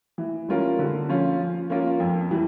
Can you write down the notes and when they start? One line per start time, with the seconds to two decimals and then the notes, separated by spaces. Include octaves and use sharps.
0.18 E3
0.49 G3 C#4 F4 A#4
0.79 D3
1.09 F3 C#4 F4
1.40 F3
1.70 A#3 C#4 F4 A#4
2.00 F2
2.31 E3 G3